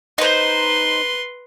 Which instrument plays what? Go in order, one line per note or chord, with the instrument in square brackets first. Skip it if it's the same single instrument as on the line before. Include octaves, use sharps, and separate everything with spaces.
[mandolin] D#4 C5 [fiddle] B4 C6